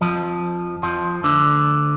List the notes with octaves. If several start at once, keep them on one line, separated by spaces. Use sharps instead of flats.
F2 F3
F2 F3
D2 D3